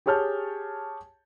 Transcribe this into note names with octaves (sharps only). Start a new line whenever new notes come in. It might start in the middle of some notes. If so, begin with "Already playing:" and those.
G4 G#4 C#5 A5 F6 G6